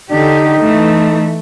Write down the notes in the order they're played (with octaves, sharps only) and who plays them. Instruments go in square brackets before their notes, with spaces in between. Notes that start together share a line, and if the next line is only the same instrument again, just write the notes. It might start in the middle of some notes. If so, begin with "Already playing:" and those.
[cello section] D3 G4 [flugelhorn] D#4
[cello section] E3 A3